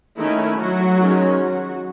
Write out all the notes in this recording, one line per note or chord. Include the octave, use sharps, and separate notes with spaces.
D#3 A3 C#4 E4
F#3 F#4
D#3 G#3 C#4
F#3 F#4